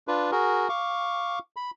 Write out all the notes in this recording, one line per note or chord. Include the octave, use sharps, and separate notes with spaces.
D4 F4 B4
F#4 G#4 A#4
F5 C#6 D6
B5